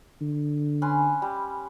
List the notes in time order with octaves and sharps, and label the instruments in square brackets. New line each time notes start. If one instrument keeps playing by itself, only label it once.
[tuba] D3
[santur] C#4 B4 C6
G3